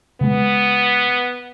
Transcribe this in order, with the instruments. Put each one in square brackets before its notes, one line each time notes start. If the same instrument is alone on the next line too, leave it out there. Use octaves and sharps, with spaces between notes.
[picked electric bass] C#3 G#3 [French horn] B3